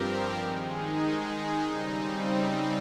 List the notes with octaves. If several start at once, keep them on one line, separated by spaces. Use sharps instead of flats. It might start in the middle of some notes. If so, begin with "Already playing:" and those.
Already playing: G2 F3 C4 G4 A#4
D#3 G#3 D#4 G#4
C#3 G3 C4 D#4